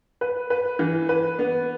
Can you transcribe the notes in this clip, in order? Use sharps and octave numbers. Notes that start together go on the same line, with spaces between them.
B4
B4
E3
B4
B3